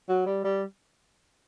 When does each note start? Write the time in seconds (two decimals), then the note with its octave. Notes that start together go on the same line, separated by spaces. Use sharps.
0.09 F#3
0.26 G3
0.44 G3